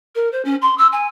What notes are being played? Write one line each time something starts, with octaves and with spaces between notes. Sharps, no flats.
A#4
C5
C#4
C6
E6
G#5